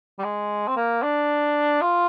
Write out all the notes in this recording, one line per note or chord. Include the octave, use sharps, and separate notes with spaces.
G3
G#3
C4
A#3
D4
F4